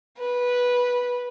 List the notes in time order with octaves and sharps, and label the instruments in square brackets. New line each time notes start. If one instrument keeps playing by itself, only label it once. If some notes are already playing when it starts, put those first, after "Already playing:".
[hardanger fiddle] B4